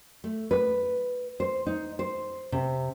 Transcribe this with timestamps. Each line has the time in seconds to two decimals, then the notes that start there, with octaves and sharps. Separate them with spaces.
0.24 A3
0.51 B4
1.40 C5
1.67 D#4
1.99 C5
2.52 C3